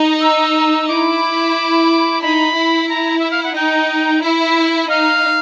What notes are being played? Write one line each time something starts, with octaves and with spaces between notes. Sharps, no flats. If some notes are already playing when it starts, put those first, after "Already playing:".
Already playing: D#4
E6
E4 D6
D#4 B5
E4
A#5
E5
F5
F#5
D#4 G5
E4 E5
E5
D#4 F5